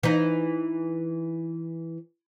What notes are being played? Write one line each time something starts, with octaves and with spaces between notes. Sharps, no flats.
E3 D#4